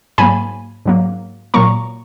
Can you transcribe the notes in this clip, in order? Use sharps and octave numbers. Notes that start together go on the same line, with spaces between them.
G#2 F#3 A#3 G#5 B5
G#2 F#3 A#3
A#2 F#3 A#3 A#5 C#6